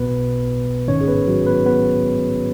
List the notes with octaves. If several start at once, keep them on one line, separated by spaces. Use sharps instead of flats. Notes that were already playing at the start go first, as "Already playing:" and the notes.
Already playing: B1 B2 B3 B4
G#1 G#2 D#3 C#4 C#5
G#4
B3 B4
F#3 F#4
B3 B4
B3 B4